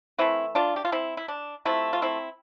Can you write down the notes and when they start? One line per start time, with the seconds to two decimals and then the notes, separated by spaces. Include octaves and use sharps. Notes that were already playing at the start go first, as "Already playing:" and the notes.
0.18 E3 A3 C4 E4
0.55 D4 F4
0.76 G4
0.85 F4
0.92 C4 E4
1.17 E4
1.28 D4
1.65 C3 F3 A3 C4 E4
1.93 F4
2.02 C4 E4